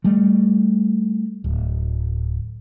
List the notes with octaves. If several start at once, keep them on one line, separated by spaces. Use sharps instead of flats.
G3 A3
D1